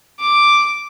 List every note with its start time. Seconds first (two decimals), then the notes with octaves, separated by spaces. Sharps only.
0.20 D6